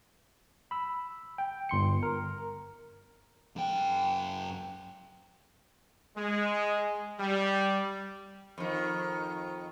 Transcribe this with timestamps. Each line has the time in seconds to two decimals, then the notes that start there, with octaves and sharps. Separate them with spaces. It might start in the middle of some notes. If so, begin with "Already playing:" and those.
0.71 B5 E6
1.38 G5
1.69 G1 C6 C#7
2.03 A#4
3.56 F#2 G5
6.17 G#3
7.19 G3
8.58 F2 D#3